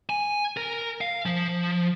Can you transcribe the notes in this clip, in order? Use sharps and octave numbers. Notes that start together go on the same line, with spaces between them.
G#5
A#4
F5
F3